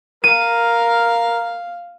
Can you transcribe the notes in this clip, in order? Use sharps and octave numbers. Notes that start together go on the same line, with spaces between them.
A#4 F5 D#7